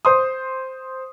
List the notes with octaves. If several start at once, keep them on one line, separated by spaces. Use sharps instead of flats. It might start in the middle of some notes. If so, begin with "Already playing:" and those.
C5 C6 D#6